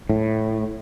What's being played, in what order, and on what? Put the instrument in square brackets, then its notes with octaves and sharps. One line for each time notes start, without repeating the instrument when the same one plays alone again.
[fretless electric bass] A2